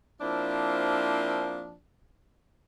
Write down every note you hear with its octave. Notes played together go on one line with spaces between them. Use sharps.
F3 A#3 C4 D4 E4